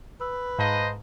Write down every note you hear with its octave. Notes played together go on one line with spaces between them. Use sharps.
B4 E6
G#2 C5 D#5 F5 A5 A#5